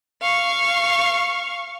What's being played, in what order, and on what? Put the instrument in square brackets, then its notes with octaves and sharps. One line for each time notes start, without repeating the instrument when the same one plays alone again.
[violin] F5 C#6